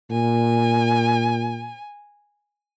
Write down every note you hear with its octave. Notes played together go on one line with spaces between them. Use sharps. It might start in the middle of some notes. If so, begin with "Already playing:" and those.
A#2 G#5